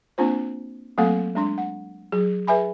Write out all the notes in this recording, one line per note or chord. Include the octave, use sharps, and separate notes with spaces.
A#3 C4 D4 F4 C5
F#3 A3 A#3 C4 A4 F5
G#3 D4 C6
F#5
F#3 G#4
G#4 B4 E5 G#5 B5